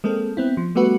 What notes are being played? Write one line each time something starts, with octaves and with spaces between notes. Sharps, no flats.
G#3 A#3 C4 A4
B3 C4 E4
F3
G3 A3 B3 F#4 B4